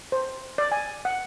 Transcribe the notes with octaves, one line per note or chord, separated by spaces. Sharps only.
C5
D5
G#5
F#5